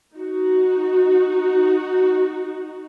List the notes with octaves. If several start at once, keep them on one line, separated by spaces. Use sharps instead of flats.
D#4 F#4